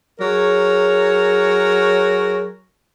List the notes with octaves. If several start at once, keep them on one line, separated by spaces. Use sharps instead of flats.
F#3 G#4 A#4 C#5